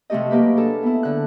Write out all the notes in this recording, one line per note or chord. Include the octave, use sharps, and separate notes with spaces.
C3 F3 A3 G4 D#5
F#3 A#3 G4 B4
D4 G#4 A4
B3 E4
D3 F#6